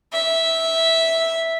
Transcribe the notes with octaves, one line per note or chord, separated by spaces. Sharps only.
E5